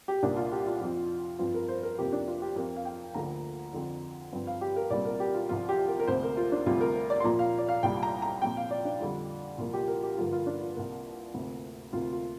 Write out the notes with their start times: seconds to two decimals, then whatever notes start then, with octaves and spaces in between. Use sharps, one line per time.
0.08 G4
0.23 C2 A#2 A#3 D4
0.37 F4
0.52 G4
0.66 F4
0.81 F2 F3 C4
1.39 G2 F3 C4 F4
1.54 A#4
1.68 C5
1.83 A#4
1.99 F2 C3 A#3 G4
2.13 D4
2.27 F4
2.42 G4
2.56 F2 F3 C4 A#4
2.76 F5
2.85 G5
3.14 D2 D3 F3 A#3 A#5
3.73 F2 D3 F3 C4
4.33 G2 F3 C4
4.47 F5
4.61 G4
4.76 A#4
4.91 C2 A#2 G3 C4 D5
5.05 A#4
5.20 G4
5.34 F4
5.49 C2 C3 F3 C4 F4
5.69 G4
5.88 A#4
6.00 A#4
6.07 D2 C3 A#3 C5
6.23 A#4
6.37 F4
6.52 D4
6.66 D2 C3 G3 F4
6.81 A#4
7.10 D5
7.20 C6
7.24 A#2 F3 A#3 A#5
7.39 F5
7.58 D5
7.69 F5
7.83 C2 A#2 G3 G5
8.03 A#5
8.22 A#5
8.42 A#2 F3 C4 G5
8.57 F5
8.71 D5
8.85 D4
9.00 F2 D3 G3
9.58 C2 A#2 F3 A#3 F4
9.73 G4
9.88 A#4
10.03 G4
10.17 G2 D3 F3 A#3 F4
10.33 F4
10.47 D4
10.61 F4
10.76 C2 C3 A#3
11.34 D2 C3 A#3
11.93 D2 C3 A#3 F4
12.13 F4